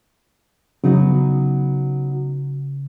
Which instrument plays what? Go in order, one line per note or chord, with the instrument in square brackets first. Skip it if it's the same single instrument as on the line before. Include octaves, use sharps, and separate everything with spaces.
[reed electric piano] C#3 [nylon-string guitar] F#3 B3 D#4